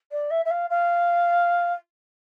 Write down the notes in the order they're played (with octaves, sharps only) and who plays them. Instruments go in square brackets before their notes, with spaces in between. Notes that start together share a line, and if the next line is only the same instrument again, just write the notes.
[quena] D5
E5
E5
F5
F5